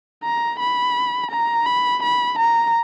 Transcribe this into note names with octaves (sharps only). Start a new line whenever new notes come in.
A#5
B5
A#5
B5
B5
A#5